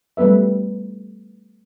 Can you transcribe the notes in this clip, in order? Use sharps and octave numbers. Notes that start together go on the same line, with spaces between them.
G3 A3 B3 B4 E5